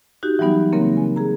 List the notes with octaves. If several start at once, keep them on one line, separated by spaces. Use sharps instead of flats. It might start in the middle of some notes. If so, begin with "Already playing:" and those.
D#4 F#4 G4
E3 F#3 G3 B3 D#4
C#3 A#3 C4 A#4
G#5
G#4 A#5